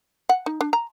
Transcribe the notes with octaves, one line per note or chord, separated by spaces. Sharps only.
F#5
D#4
D4
A#5